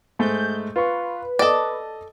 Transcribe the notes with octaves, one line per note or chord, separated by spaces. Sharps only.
G#2 G#3 A3 G6
F4 B4 C#6
A4 D5 D#5 A5 D#6